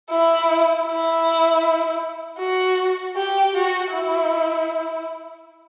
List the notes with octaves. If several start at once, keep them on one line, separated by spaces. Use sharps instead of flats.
E4
E4
F#4
G4
F#4
E4